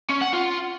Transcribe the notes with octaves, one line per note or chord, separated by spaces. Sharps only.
C#4
F#5
F4